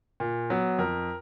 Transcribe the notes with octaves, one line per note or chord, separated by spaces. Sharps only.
A#2
F#3 B3
F2 A#4